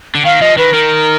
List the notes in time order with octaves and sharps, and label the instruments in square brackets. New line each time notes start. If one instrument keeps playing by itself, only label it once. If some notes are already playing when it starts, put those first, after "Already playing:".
[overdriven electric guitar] D3
[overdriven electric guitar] D#3 [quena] F5
[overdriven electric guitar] F3 [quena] D#5
[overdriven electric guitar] D#3 [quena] B4
[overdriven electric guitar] D#3 [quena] A#4